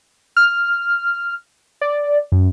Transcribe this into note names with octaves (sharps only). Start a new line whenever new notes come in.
F6
D5
F#2